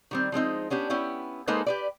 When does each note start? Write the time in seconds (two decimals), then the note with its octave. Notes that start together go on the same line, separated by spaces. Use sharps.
0.11 D#3 G3 C4
0.32 F3 G#3 C4 D#4
0.70 B3 C#4 D4 G4
0.90 B3 C#4 E4 G5
1.47 G#3 A#3 D#4 A4 B4 C5
1.66 G4 B4 D5